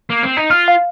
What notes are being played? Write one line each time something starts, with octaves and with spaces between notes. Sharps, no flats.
A#3
C4
D#4
F4 F6
F5